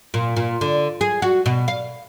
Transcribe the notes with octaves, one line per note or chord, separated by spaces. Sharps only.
A#2
A#2
D3
G#4
F#4
B2
F5